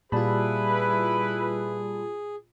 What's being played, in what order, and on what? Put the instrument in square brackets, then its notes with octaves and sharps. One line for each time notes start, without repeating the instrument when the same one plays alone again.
[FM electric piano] A#2 F4 [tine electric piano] G3 A5 B5 [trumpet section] E4 B4 [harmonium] G#4